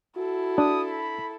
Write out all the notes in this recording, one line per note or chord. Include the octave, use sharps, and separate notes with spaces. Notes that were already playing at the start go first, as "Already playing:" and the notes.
E4 F#4 A4
D4 D#6
B5